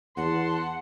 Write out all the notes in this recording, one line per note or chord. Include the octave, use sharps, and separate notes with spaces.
E2 F#5 A5 C6